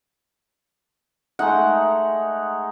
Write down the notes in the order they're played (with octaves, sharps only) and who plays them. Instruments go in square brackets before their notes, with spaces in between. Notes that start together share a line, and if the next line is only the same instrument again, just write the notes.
[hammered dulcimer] G#3 A3 D#4 [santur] F#5